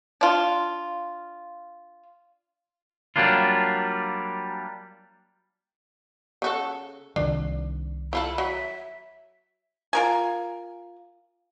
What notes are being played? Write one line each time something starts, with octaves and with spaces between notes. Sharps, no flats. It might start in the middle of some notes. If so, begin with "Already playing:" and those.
D4 F4
F#3 G3 A#3 D4 F4
C#3 F#4 A4
C2 D#3 F3 D4
E4 F4 A4 B5
F#3 E5
F4 A#4 G#5